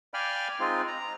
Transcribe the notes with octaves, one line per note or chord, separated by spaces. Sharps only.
D5 F5 G5 G#5 B5 F6
G#3 C4 D#4 F4
A#5